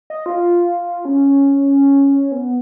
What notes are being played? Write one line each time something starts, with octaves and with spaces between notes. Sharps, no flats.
D#5
F4
C#4
B3